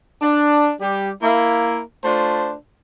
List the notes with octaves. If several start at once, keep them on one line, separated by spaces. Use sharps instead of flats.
D4
G3 G4
A#3 E4
A3 D4 F4 C5